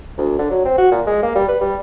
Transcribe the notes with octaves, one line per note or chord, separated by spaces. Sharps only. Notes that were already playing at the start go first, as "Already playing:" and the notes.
D2
D3
F#3
C4
F#4
A#2
G#3
A#3
G3
B4
G3